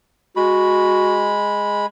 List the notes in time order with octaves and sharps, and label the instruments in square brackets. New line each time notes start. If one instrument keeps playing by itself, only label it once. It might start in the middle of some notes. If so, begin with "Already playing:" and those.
[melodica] G#3 B5 [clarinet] F#4